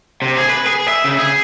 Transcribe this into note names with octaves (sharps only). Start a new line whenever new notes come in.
C3
G#4
B4
G#4
E5
C#3
G#4